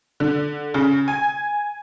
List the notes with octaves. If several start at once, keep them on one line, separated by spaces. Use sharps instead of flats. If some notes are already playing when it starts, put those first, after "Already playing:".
D3
C#3
G#5